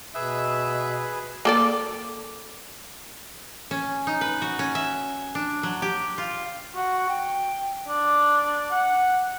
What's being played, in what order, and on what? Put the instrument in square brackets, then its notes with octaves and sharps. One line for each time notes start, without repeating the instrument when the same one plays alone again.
[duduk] B2 [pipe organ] G#4 B4 [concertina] E5
[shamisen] A#3 A4 D5
[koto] C#4
D#4
B4
F#4
C#4
E5
D4
F#3
G4
F4
[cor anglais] F#4
G5
D4
F#5